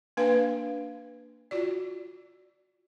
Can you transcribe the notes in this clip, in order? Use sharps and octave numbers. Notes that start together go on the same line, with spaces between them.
A#3 D4 B4 F5
F4 F#4 D5